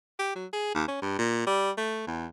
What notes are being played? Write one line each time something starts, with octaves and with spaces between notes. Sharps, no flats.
G4
F#3
G#4
D#2
C#4
G2
A#2
G3
A3
E2